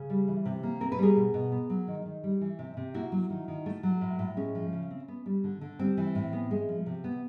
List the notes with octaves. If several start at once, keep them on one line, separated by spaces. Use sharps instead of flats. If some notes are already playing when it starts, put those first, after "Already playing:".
Already playing: C#3
G3
E3
C3
A#3
C4 A#4
B4
G3 G#4 A#4
B2
B2
B3
F#3
D#3
D#3
G3
E3
C3
C3
A#3 E4 F#4
F#3
D#3
D#3
A3
F#3
A2
A2
G#3 C#4
F3
C#3
C4
B3
G3
D3
D3
G3 C4
E3
A2
B3
G#3
F3
C3
B3